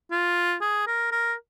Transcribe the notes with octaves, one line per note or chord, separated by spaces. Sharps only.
F4
G#4
A#4
A#4